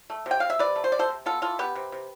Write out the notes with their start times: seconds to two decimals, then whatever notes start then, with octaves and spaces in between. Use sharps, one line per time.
0.10 A3
0.26 C3
0.31 G5
0.40 C3 F5
0.50 E5
0.59 C3 B4 D5
0.76 A3
0.84 C5
0.92 C3 D5
0.99 A4 C5
1.09 C3
1.26 B3 F4 A4
1.42 E3 F4 A4
1.59 B3 G4 B4
1.75 C3
1.92 C3